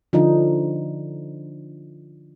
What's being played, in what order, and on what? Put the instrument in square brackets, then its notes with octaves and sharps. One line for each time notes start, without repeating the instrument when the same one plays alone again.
[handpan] D3 F3 D4 D#4